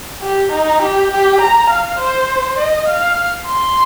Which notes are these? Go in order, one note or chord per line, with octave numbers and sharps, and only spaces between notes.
G4
D#4
G4
G4
A#5
F5
C5
D#5
F5
C6